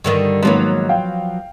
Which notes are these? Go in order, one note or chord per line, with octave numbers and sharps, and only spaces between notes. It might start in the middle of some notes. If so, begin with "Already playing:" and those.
G2 D3 D#3
G#2 D#3 F3 F#3 A#3 B3
F5 G5